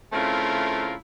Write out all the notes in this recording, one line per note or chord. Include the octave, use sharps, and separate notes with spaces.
C#3 A3 C4 E4 F4 A#4